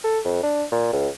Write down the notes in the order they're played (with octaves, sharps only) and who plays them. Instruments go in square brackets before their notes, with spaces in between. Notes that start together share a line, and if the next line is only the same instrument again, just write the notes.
[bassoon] A4
F2
D4
A#2
C#2